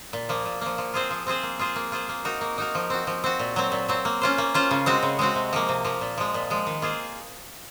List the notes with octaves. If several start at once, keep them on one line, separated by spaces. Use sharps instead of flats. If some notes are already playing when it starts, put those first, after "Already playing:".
A#2
F3 A#3
A#2
F3 A#3
F3
C4 F4 G#4 C5
F3
C4 F4 G#4 C5
A#3
F4 G#4 C5
A#3
F4 G#4 C5
A#3
D#4 F#4 A#4
A#3
D#4 F#4 A#4
F3
C4 F#4
F3
C4 F#4
A#2
F#3 C4
A#2
F#3 C4
A#3
C#4 F4 C5
A#3
C#4 F4 C5
C#3
G#3 C4 F#4
C#3
G#3 C4 F#4
C3
F3 A#3
C3
F3 A#3
A#2
F3 G#3
A#2
F3 G#3
D#3
A#3 F4 G#4 C5